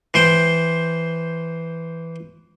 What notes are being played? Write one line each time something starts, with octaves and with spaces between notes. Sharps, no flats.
E3 C5 G5